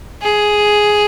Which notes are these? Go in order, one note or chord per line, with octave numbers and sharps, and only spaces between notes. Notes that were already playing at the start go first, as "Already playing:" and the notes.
G#4